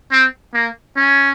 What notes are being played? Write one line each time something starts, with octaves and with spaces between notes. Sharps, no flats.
C4
A#3
C#4